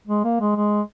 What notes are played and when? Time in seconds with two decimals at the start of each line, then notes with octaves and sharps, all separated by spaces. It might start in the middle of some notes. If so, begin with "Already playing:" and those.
0.07 G#3
0.24 A#3
0.40 G#3
0.56 G#3